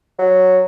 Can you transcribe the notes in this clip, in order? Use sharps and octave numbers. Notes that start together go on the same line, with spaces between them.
F#3